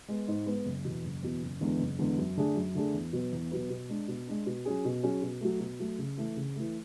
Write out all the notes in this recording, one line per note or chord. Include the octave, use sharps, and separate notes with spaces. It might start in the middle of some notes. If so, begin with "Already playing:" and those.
G#3 B3
G#2
G#3 B3
F#1
E2 B2
F#1
E2 B2
F#1
E2 D3 G#3 B3
F#1
E2 D3 G#3 B3
F#2
D3 A3 D4 G#4
F#2
D3 A3 D4 G#4
E2
B2 F#3 B3
E2
B2 F#3 B3
B2
G#3 D4
B2
G#3 D4
B2
F#3 C#4 G#4
B2
F#3 C#4 G#4
B2
F#3 A3
B2
F#3 A3
C#3
E3 A3
C#3
E3 A3